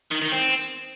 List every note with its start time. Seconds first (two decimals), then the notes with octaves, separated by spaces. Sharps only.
0.11 D#3
0.22 D#3
0.32 C4